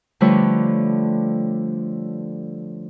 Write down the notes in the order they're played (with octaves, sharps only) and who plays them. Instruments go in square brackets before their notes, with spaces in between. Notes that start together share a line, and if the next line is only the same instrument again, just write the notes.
[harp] D3 F3 G3 A3 B4 C#5